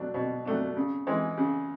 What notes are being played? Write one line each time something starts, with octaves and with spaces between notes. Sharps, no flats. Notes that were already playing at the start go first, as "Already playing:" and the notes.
Already playing: B2 F#3 A3 D4
B2
F#3 A3 D4
C#3
E3 G#3
C#3